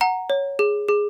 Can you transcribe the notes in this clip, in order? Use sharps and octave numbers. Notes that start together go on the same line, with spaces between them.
F#5 A#5
C#5
G#4
G#4